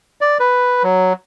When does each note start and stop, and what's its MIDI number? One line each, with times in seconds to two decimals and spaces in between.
0.21 0.38 74
0.40 0.83 71
0.83 1.13 54